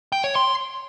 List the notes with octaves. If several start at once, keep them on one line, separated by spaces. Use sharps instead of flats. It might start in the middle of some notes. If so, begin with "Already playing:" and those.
G5
C#5
C6